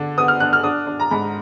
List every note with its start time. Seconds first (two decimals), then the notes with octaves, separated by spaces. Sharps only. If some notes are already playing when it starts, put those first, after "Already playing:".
Already playing: D3 D4
0.18 B3 D#6
0.28 F6
0.40 D4 F#6
0.53 F6
0.63 D4 D#6
0.87 D4
1.00 A#5
1.11 G#2 B5